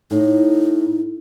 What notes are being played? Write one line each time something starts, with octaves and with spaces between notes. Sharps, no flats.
A2 D#4